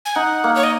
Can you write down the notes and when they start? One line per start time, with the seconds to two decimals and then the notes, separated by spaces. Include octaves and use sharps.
0.05 G#5
0.15 D#4 F#5
0.44 A#3
0.55 C#5
0.63 D#5